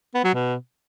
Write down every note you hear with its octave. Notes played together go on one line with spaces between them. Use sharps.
B3
F#3
B2